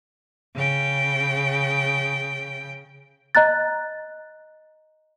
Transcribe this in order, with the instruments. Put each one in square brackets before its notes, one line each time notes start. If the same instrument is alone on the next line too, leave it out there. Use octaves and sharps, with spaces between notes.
[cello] C#3 G5
[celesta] D#5 A#5 F#6 A6